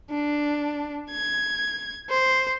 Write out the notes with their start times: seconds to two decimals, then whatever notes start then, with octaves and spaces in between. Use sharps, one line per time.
0.11 D4
1.11 G#6
2.10 C5